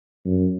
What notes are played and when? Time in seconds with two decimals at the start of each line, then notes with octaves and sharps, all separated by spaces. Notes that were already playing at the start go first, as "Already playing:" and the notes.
0.25 F#2